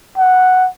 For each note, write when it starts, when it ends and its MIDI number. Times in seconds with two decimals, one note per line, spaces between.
0.18 0.68 78